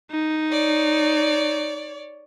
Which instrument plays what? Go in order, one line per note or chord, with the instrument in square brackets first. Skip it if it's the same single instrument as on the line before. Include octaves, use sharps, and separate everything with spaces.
[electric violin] D#4
[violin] C#5 D5